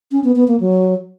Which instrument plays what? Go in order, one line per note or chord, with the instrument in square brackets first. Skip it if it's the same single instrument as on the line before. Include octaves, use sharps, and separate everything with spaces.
[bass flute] C#4
B3
B3
A#3
F#3